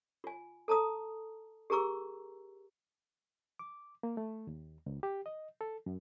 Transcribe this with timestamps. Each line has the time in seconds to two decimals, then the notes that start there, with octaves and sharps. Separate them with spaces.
0.24 F4 G#5
0.68 A4 A5 A#5 D#6
1.70 G4 G#4 A#4 A#5 C#6 E6
3.59 D6
4.03 A#3
4.17 A3
4.47 D#2
4.86 C#2
5.03 G4
5.26 D#5
5.61 A4
5.86 F#2